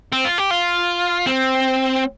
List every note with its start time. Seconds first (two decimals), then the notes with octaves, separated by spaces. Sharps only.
0.13 C4
0.25 F4
0.38 G4
0.50 F4
1.27 C4